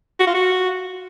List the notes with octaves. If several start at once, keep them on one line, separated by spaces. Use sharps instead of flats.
F#4
F4
F#4